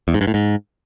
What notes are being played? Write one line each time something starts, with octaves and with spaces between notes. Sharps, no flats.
E2
G#2
G2
A2
G#2